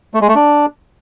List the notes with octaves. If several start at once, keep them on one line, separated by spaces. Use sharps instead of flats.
A3
G#3
A3
D4